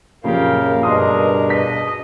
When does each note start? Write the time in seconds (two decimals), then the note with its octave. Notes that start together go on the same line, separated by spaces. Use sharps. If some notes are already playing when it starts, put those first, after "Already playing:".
0.24 F#2 A#2 C#3 F3 C#4 G4 A#4 F5
0.83 G2 B2 D4 G#4 A#4 D#5 C6 D#6
1.50 D#5 B6